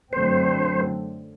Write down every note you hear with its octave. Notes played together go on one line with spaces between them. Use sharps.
F#2 D3 F#3 A3 C4 C5